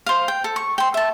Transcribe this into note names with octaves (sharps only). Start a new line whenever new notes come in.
C5 F5
G5
A4
C#6
G5 C6
E5 A5